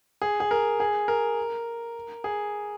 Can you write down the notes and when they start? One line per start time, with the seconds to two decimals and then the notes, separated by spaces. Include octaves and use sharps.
0.22 G#4
0.40 G#4
0.51 A#4
0.80 G#4
1.08 A#4
2.24 G#4